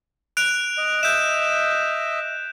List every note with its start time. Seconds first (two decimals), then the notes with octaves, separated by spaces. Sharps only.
0.37 F#6 D7 F7
0.78 D#5
1.03 D#5 E5 G6 E7